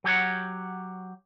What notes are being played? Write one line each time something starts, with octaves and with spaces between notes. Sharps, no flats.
F#3 G4 C#5 F#5